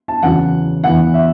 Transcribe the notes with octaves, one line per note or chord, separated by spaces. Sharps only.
A5
E2 C#3 F#3 F#5
E2 E3 B3 F#5
E5